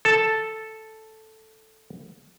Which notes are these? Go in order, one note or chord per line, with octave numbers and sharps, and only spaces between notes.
A4 A5